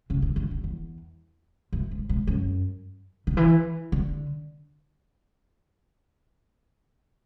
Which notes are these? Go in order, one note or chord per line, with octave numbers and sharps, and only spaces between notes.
C#3
D3
D3
D3
E2
F#2
G#2
G#2
F#2
D3
E3
D3